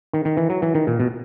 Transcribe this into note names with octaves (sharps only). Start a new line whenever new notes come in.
D#3
D#3
E3
F#3
E3
D#3
A#2
B2